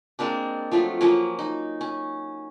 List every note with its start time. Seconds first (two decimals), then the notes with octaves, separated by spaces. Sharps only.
0.19 G#3 A#3 C4 D4
0.71 F3 F#3 A3 F4
1.01 F3 F#3 A#3 C#4
1.39 D#4
1.81 C#4